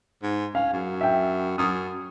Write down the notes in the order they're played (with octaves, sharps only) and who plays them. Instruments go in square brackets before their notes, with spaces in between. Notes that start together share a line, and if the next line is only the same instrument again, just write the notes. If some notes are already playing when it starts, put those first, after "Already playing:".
[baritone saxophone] G#2
[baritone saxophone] C#4 [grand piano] F5
[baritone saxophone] F#2
[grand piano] E5 G5
[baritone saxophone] F#2 [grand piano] D#6